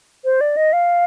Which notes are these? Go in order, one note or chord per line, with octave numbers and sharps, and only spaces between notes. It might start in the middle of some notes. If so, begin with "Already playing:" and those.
C5
D5
D#5
F5